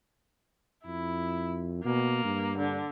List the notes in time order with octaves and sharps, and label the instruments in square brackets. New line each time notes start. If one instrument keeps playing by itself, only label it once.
[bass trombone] F2 [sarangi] E4
[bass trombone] B2 [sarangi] A#3
[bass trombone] G2
[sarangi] D3